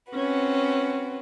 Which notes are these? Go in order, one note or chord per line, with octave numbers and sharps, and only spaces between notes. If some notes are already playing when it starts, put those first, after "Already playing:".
C4 C#4 F#4 B4